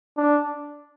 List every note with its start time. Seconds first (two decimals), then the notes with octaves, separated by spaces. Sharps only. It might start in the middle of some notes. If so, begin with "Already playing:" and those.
0.17 D4